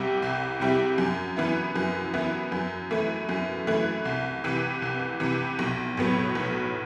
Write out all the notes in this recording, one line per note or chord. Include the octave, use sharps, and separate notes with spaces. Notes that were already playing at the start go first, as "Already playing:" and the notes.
Already playing: C2 C3 G3 C4 E4
C2
C3 G3 C4 E4
F#2
E3 B3 E4
F#2
E3 B3 E4
F#2
E3 A3 E4
F#2
E3 A3 E4
C2
C3 E3
C2
C3 E3
B1
A2 F#3 B3
B1